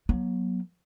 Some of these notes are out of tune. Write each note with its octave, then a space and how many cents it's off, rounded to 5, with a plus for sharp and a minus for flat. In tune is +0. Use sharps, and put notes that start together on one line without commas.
F#3 +0 B3 -45